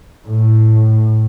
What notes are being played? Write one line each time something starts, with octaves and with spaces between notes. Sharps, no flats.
A2